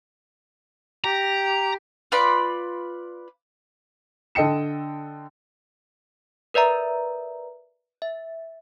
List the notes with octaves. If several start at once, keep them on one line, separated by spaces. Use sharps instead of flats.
G4 A#5
F4 B4 D5 B5
D3 A4 D#5 G5 C#7 E7
A#4 B4 D5 E5 A#5
E5